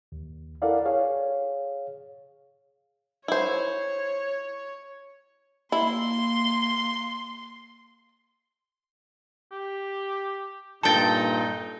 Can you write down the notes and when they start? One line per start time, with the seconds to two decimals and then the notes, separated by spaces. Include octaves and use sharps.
0.12 D#2
0.62 E4 A4 A#4 D5 F5 F#5
0.86 G#4 C#5 F5
3.28 E4 C5 C#5
5.72 A#3 E4 C6
9.52 G4
10.83 G2 A#2 D#4 A4 G5 A5 A6